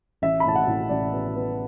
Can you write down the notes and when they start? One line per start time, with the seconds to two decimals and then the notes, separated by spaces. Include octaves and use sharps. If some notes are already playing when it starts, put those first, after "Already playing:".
0.22 A1 E5
0.40 B5
0.45 A2 A5
0.55 F#5
0.67 A2
0.89 A1 D5
1.12 B3
1.35 B3